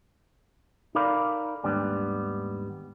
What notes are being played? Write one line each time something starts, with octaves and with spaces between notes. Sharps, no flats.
D#4 A4 A#4 D5 F5 B5
D#2 G#2 G3 B3 D4